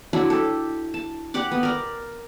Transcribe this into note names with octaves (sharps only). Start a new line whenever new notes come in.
F#3 D4 E4
G4 A4
A5
G4 D5 F#5 D6
B3
A#4 D5